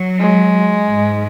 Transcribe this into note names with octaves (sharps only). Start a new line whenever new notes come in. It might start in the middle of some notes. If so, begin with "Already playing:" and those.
Already playing: F#3
G#3
G#2